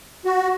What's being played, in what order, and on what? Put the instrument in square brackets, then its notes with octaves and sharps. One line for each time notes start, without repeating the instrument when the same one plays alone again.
[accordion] F#4